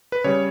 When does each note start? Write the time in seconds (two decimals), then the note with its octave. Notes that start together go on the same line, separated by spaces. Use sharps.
0.12 B4
0.24 C#3 G3 C#5